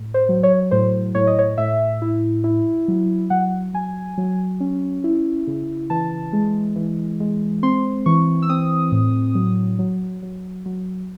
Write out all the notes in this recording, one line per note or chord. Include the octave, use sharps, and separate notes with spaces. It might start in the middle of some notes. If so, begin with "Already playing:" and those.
Already playing: A2
C5
F#3
C#5
A2 C5
A2 C#5
D#5
C#5
A2 E5
E4
E4
F#3
F#3 F#5
F#3 G#5
F#3
C#4
E4
C#3
E3 A5
G#3
E3
G#3
C4 C6
E3 C#6
E6
C4 D#6
A2
F#3
F#3
F#3
F#3